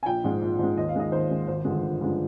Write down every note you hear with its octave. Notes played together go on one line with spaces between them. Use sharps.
G#5
A#1 G5
G#2 F3 G#3
A#1
G#2 F3 G#3
D#2 D#5
F5
D#3 G#3 D#5
D#2 C5
D#3 G#3
G#1 C5
G2 D3 F3 G#3
G#1
G2 D3 F3 G#3